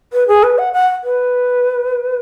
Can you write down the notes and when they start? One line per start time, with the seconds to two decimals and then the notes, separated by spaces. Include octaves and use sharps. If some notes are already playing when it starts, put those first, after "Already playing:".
0.13 B4
0.28 G#4
0.43 B4
0.58 F#5
0.73 F#5
1.04 B4